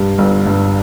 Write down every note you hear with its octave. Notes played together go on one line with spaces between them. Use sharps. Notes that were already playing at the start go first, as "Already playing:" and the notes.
Already playing: G2 G3
G1
G2